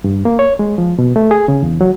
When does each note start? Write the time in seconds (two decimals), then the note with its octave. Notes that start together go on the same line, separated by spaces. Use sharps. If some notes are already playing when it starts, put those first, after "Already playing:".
0.04 G2
0.25 A#3
0.39 C#5
0.59 G#3
0.78 F3
0.99 B2
1.16 A3
1.31 G#4
1.48 C#3
1.63 E2
1.81 F#3